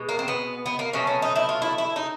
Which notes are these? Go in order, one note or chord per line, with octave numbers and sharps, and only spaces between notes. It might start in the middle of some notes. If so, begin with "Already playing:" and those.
Already playing: B2 G#3
A#3
C4
B3
B3
A#3
B2 F#3 A3 C#4
C#4
D#4
E4
F4
E4
E4
D#4